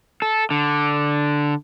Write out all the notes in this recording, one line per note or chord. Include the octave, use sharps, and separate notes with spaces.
A4
D3